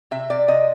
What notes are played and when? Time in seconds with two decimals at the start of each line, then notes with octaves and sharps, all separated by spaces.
0.11 C3 E5
0.30 C3 D5
0.48 C3 D#5